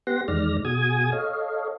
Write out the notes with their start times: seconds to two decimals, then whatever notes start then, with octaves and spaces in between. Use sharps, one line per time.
0.07 B3 G4 F#5 C6 A#6
0.28 E2 D#3 G#3 D5 F6 A#6
0.65 B2 F#4 G#4 G#5 D#6 G#6
1.12 A4 C#5 D#5 F5